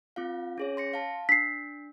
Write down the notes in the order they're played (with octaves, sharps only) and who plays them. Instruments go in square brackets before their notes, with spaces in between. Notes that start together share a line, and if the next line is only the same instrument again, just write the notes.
[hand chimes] C4 F4 F5
C#4 G#4 C#5
C6 A#6 C#7
F5 A5
[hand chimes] D4 [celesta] B6 C7